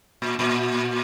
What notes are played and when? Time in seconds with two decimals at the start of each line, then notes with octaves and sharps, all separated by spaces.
0.22 A#2
0.39 A#2